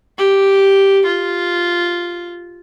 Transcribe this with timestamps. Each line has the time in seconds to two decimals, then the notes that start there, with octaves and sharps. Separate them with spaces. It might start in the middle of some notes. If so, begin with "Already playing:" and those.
0.18 G4
1.06 F4